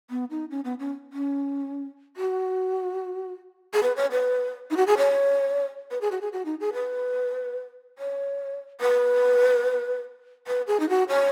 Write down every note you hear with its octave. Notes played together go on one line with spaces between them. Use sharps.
B3
D#4
C#4
B3
C#4
C#4
F#4
G#4
B4
C#5
B4
D#4
F#4
G#4
C#5
B4
G#4
F#4
G#4
F#4
D#4
G#4
B4
C#5
B4
B4
G#4
D#4
F#4
C#5